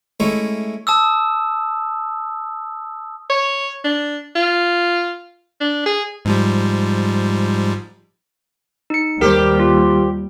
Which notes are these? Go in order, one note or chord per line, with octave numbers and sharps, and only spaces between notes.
G#3 A3 C#4 E4
A5 D#6 E6
C#5
D4
F4
D4
G#4
G#2 F3 G3
D#4 C#7
D#2 G3 G4 A#4 C5
F4